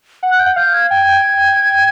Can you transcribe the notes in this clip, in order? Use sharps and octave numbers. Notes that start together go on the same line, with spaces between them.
F#5
F#6
G6
F#5
F5 G6
G#6
G5 G#6